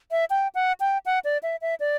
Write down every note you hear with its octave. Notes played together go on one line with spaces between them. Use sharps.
E5
G5
F#5
G5
F#5
D5
E5
E5
D5